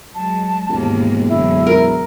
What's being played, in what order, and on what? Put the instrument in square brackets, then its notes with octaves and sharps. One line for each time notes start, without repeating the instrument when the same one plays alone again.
[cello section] F#3 G#3 [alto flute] A5
[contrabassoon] E1 [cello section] D#2 G#2 A#3
[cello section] F#2 D3 [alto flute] E4
[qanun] A#4